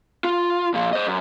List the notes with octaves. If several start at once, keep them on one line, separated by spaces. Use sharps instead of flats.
F4
A#2 F3
C5 D#5
F#2